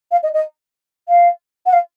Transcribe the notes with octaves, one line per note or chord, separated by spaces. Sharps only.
F5
D#5
D#5
F5
F#5
F5